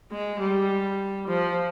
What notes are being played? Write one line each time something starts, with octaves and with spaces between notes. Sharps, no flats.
G#3
G3
F3